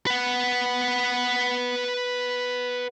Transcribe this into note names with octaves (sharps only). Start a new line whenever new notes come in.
B4 F#5